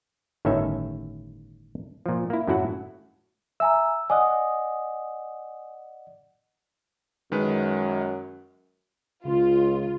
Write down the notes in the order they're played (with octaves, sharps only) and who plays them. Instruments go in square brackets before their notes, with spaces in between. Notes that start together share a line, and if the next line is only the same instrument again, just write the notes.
[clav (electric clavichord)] G1 A2 D#3 C#4 D#4 E5
A#2 F3
A#3 E4
F#2 A2 F#3 E4 F#4 F#5
[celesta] E5 G#5 A#5 [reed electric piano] E6
[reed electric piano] D5 D#5 F#5 [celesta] G#5 D#6
[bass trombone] F#2 [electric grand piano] D#3 G#3 B4
[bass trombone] C#2 [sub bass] C#3 [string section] F4